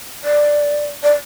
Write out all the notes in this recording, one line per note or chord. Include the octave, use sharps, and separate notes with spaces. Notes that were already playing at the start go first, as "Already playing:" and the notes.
D5
D5